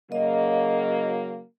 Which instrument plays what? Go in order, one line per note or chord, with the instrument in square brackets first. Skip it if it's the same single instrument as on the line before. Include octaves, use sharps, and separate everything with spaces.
[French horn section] C#3 F#3 A#3 [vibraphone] D#5